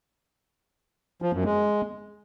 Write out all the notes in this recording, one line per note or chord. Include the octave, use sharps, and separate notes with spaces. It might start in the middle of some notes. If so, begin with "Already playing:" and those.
F3
F#2
G#3